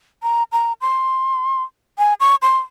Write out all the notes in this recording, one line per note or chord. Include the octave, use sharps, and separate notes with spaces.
A#5
A#5
C6
G#5
C#6
C6